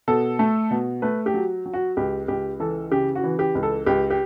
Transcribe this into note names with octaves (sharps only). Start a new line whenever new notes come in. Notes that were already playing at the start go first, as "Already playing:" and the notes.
B2 A4
A3
B2
A3 B4
G4
F#3
F#3
F#4
C#2 G4
C#2 G4
E3 A4
C#3 G4
F#4
E3
G4
C#2
A4
C#2 G4
G4